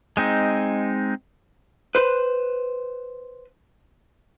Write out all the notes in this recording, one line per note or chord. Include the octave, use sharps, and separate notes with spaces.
G#3 C4 D#4
B4 C5